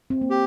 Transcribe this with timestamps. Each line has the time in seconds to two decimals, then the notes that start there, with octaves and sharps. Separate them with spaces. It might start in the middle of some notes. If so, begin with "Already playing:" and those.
0.10 C4
0.21 A#3
0.30 G4